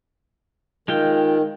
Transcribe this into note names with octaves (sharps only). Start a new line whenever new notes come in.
D#3 G#3 F4 G5